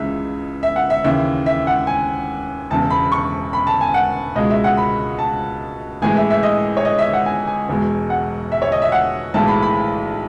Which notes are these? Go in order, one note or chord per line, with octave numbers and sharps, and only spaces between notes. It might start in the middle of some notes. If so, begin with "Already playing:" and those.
Already playing: C#2 C#3 E3 G#3 E5
E5
F#5
E5
D#2 C#3 E3 E5
E5
F#5
G#5
E1 E2 C#3 A5
B5
C#6
B5
A5
G#5
F#5
C#2 B2 G#3 D#5
E5
F#5
B5
A5
A1 A2 E3 G#3 G#5
E5
E5
D#5
C#5
D#5
E5
F#5
G#5
G#5
E1 E2 B2 G#3
F#5
E5
C#5
D#5
E5
F#5
B1 A2 E3 G#3 A5
B5
B5